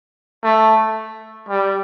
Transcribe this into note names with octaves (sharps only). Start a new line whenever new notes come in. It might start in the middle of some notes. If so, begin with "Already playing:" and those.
A3
G3